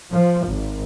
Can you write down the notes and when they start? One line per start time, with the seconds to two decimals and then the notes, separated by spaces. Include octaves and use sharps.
0.12 F3
0.47 G#1